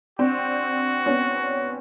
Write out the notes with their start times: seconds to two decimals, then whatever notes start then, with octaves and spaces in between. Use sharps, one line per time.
0.19 C4 D4 F#4
1.06 B3 C#4